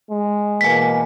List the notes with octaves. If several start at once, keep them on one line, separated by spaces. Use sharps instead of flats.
G#3
B2 E3 A#3 G#5 B6